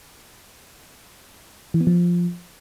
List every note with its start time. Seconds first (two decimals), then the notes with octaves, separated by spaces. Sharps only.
1.74 E3
1.81 B3
1.87 F3